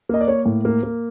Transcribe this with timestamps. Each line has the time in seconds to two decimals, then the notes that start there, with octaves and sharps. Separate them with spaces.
0.09 A#3 D#5
0.21 D5
0.27 A#3 C#5
0.46 A2
0.65 A#3
0.83 A#3